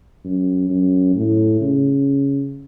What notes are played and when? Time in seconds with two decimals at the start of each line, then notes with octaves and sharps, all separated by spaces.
0.25 F#2
0.70 F#2
1.16 A2
1.61 C#3